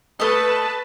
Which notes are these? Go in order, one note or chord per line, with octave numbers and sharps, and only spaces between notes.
A3 B4 D#5 A5